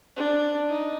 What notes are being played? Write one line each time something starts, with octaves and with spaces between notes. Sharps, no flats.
D4
D#4